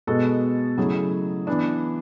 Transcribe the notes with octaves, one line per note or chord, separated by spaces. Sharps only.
B2 G#3 B3 F#4 A4
C#3 F#3 A3 E4 G#4
E3 B3 D4